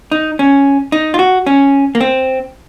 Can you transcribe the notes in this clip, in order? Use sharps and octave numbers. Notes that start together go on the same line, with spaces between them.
D#4
C#4
D#4
F4
F#4
C#4
A#3
C4